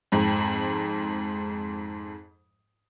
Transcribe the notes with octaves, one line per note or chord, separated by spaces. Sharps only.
F2 G#2